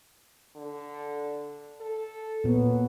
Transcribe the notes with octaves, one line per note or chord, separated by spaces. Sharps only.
D3
A4
A#2 F#3 B3